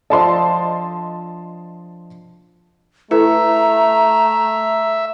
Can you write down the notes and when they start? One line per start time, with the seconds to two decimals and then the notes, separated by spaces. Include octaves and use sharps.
0.10 F3 D4 A4 D#5 A5 C6
3.11 A3 E4 A4 B4 E5 A#5